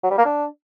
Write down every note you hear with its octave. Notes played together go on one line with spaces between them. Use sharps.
F#3
G3
A#3
D4